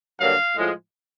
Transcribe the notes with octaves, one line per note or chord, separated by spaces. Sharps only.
G2 D3 F#3 A#3 F5
A2 F3 G#3